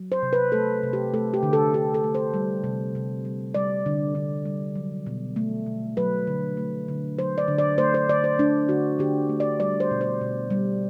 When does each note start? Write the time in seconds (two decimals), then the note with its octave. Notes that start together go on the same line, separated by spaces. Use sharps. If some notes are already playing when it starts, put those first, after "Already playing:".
Already playing: F#3
0.12 C5
0.23 C3
0.33 B4
0.52 A3 A4
0.83 C3
0.93 G4
1.14 A3 A4
1.34 G4
1.43 D3
1.53 A4
1.73 D3 G4
1.94 A4
2.04 A3
2.15 C5
2.34 G3
2.64 C3
2.95 C3
3.25 G3
3.54 G3 D5
3.86 D3
4.15 D3
4.45 G3
4.75 F#3
5.06 B2
5.36 A3
5.66 B2
5.97 F#3 B4
6.27 D3
6.57 A3
6.88 D3
7.19 F#3 C5
7.38 D5
7.48 D3
7.59 D5
7.78 A3 C5
7.94 C5
8.09 D3 D5
8.24 C5
8.39 A3 D4
8.69 D3 F#4
8.99 D3 G4
9.29 A3
9.40 D5
9.60 G3 D5
9.80 C5
9.91 B2
10.01 C5
10.21 B2
10.50 G3